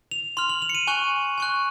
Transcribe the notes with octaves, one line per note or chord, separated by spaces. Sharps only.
F7
C6 F6 F7
F#7
F7
C#7
D#7
G#5 C#6 F#6
G#5 C#6 F#6